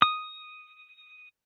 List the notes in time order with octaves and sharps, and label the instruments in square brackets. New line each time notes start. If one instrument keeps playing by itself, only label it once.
[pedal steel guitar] D#6